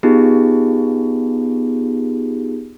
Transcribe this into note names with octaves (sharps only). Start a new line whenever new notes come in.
B3 D#4 F4 G4 G#4